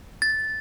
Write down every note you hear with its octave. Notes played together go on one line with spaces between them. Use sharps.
A6